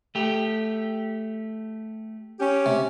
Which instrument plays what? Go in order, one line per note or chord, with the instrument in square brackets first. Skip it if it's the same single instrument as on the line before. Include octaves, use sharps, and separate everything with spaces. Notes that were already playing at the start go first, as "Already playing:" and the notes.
[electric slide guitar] A3 G4
[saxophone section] C#4 G4
[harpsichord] C3